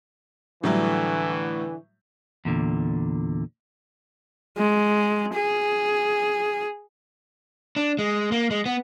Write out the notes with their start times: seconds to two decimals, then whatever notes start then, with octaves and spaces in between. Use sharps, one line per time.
0.64 A2 D3 E3 F#3 G3
2.45 E2 A#2 D3
4.57 G#3
5.35 G#4
7.76 D4
7.99 G#3
8.32 A#3
8.51 G#3
8.66 B3